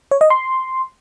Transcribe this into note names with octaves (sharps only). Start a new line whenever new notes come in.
C#5
D#5
C6